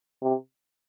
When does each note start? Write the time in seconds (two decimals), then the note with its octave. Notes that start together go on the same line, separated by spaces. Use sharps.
0.22 C3